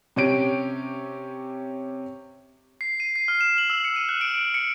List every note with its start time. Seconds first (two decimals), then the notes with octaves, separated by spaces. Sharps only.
0.16 C3 C#4 G4 D7
2.81 C7
3.00 D#7
3.16 C7
3.28 F6
3.41 E7
3.58 F#7
3.70 E6
3.85 C#7
3.96 D#7
4.09 F#6
4.21 D7
4.54 C#7